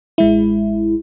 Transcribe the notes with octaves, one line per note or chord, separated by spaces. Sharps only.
A1 G#3 E4